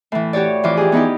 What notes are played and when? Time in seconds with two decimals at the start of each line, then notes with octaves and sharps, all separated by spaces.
0.12 A2 E3
0.33 F#4 G4 C#5 D5
0.63 F2 E3 F4 D6
0.77 G4 G#4
0.92 B3 D#4 E4 G4